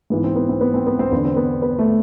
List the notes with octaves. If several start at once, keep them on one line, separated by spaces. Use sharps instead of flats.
G#2 E3 B3
C4
B3
C4
B3
C4
B3
C4
E2 D3 B3
C4
B3
B3
A3